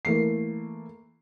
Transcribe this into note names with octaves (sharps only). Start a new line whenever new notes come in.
E3 A3 A#3 C7